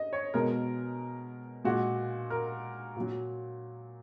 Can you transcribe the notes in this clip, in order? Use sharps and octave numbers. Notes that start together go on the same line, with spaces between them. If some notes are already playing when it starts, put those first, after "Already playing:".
Already playing: D#5
C#5
B2 G#3 A#4
A#2 G#3 F#4
A#4
A#2 F#3